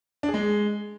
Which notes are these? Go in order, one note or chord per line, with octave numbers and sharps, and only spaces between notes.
D4
G#4
G#3